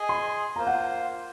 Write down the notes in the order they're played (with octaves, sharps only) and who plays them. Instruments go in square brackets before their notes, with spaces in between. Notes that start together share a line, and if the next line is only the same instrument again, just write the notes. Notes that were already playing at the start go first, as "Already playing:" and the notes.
Already playing: [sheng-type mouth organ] G#4 D#5 G#5
[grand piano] C6
[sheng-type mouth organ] A#3 F4 C5 [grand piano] A#5
[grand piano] F#5